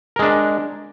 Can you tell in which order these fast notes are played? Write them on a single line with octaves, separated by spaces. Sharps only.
A#4 G#3 D4